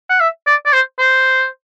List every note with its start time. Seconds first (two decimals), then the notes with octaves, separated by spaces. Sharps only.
0.09 F#5
0.20 E5
0.47 D5
0.66 D5
0.73 C5
0.99 C5